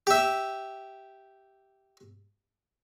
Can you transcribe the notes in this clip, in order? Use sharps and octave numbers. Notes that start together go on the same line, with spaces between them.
G4 E5